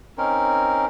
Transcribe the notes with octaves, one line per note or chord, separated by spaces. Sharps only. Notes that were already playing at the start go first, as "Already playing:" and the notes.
C4 C#4 D#4 A#4